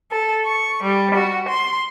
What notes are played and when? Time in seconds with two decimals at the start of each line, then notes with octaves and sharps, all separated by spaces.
0.11 A4
0.45 C#6
0.83 G3
1.15 F#4
1.49 C6